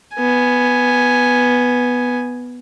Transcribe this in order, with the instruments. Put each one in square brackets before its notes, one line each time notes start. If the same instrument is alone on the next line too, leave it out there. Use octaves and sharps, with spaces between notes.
[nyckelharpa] B3 G#5